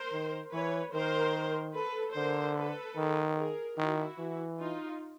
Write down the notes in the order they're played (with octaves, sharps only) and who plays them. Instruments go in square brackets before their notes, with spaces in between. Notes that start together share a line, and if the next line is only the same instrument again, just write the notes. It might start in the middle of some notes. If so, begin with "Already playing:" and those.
Already playing: [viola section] A#4 C5
[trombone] D#3
[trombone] E3 [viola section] B4 C#5
[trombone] D#3 [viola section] A#4 C5
[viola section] A4 B4
[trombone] D3 [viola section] A#4 C5
[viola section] A4 B4
[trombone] D#3
[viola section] G#4 A#4
[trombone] D#3 [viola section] E4 F#4
[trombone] E3
[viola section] D#4 F4